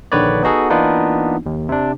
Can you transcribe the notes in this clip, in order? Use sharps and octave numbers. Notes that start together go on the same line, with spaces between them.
A#1 D3 D#3 B4 C#5 D5
B3 D#4 F#4 G#4 A4
E3 A#3 B3 D4 D#4 F4
D#2
C3 D4